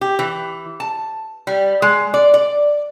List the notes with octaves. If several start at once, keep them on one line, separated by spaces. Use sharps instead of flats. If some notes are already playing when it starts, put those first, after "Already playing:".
G4
E3
A5
G3
G#3
D5
D5